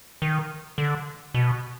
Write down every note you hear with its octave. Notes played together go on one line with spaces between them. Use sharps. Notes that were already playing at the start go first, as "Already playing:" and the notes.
D#3
D3
B2